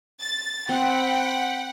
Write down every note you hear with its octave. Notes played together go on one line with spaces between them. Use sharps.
A6
C4 F#5 G5 B5